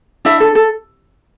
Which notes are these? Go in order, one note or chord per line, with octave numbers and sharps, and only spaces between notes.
D4 E4 E5
A4
A4